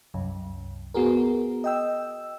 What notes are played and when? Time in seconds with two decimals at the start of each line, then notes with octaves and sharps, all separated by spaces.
0.14 C2 F#2
0.94 B3 F#4 G#4 A#4
1.64 D#5 G5 E6